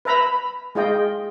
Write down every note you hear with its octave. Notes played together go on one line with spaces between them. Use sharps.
B4 E5 A#5 B5
G#3 F4 D#5 G5